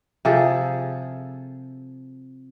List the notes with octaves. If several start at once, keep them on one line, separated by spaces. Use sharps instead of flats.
C3 F3 G#4 A4